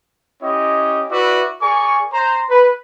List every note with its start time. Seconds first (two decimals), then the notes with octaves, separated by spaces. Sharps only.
0.42 C#4 E4 G4 C#5 D#5
1.11 E4 F#4 B4 D5 E5 D6
1.62 G#4 A#4 D5 G#5 C#6
2.13 C5 A#5
2.50 B4